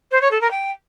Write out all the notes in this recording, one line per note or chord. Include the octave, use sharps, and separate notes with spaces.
C5
C#5
A4
A#4
G5